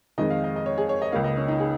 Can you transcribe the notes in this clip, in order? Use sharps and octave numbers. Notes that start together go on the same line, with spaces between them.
F2 D#3 G#3 D#5
F5
D#5
D#5
C#5
G#4
C#5
D#5
C#2 C#3 A#3 F5
D#5
C#4
D#4
G#4